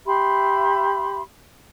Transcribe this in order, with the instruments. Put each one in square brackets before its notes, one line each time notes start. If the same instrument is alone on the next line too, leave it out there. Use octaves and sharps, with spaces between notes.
[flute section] G4 E5 B5 C6